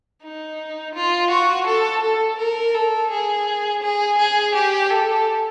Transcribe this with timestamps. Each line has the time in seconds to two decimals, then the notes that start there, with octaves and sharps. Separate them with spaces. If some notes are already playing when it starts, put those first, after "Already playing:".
0.23 D#4
0.95 F4
1.31 F#4
1.67 A4
2.03 A4
2.39 A#4
2.75 A4
3.11 G#4
3.82 G#4
4.18 G#4
4.55 G4
4.90 A4